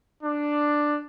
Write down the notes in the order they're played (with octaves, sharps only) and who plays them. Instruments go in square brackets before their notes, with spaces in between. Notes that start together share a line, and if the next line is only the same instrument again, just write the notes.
[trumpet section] D4